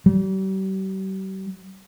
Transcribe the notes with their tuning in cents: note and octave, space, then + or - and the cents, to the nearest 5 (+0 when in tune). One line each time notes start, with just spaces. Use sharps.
G3 -40